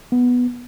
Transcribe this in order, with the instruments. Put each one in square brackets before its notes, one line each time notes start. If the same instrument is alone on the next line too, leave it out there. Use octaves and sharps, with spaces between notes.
[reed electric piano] B3